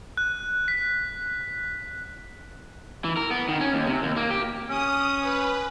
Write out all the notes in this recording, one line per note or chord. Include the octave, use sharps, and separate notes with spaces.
F#6
B6
E3
A#4
B3
D#3
C#4
D#2
C3
D#2
A#3
G4
C#4 D#6
B4